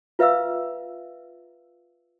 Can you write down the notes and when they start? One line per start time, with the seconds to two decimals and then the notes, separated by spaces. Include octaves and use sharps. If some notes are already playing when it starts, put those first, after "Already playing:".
0.19 F4 B4 E5 F5 E6